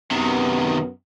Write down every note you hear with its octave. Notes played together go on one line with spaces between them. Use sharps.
F#2 C3 D#3 B3